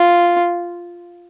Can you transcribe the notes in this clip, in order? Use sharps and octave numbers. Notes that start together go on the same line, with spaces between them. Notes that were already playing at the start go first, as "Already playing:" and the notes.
Already playing: F4